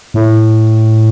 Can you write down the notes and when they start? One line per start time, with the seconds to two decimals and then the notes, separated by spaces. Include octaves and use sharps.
0.14 A2